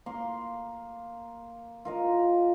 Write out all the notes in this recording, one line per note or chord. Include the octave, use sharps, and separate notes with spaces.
A#3 C6
F4 A#4 D#5